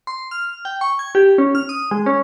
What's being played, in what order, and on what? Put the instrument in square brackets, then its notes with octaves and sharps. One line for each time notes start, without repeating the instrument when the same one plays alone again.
[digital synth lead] C6
F6
G5
C#6
G#6
G4
C#4
F6
D#6
G#3
C#4